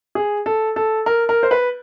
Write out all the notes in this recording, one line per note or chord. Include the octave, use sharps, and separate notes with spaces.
G#4
A4
A4
A#4
A#4
C5
B4